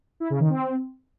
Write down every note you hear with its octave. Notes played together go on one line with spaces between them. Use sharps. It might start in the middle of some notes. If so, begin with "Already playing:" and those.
E4
C#3
D#3
C4